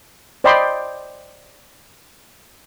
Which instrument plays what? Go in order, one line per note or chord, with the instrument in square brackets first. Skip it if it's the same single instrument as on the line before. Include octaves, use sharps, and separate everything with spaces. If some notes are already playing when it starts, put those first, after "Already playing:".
[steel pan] C5 D5 D#5 G5 B5 C6